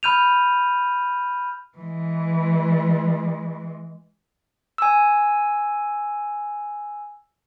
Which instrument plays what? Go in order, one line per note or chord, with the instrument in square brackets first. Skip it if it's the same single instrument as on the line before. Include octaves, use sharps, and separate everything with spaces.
[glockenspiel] B5 F6 G6 D#7 F7
[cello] E3 G#3
[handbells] G#5 E6